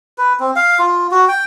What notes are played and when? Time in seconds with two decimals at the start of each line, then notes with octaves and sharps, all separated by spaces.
0.18 B4
0.40 C4
0.56 F5
0.79 F4
1.11 F#4
1.29 G5